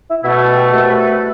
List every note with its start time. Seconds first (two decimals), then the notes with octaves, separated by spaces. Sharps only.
0.08 E4
0.24 B2 A3 E4
0.40 E4
0.56 G4
0.72 C2 B2 A3 A4
0.88 B4
0.98 A4
1.04 B4